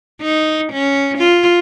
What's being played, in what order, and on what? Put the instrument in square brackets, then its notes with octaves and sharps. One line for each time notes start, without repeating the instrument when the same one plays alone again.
[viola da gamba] D#4
C#4
F4